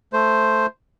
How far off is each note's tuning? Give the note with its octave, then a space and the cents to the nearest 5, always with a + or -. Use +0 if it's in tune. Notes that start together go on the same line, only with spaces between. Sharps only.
A3 +0 C5 +0